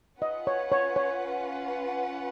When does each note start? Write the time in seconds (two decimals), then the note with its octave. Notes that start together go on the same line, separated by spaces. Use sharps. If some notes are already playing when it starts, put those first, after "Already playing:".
0.21 C#4 F4 B4 D#5 F#5
0.47 C#5
0.72 C#5
0.96 C#5